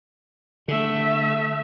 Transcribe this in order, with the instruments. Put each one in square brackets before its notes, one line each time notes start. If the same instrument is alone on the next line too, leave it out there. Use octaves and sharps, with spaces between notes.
[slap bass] D3 [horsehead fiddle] A3 E5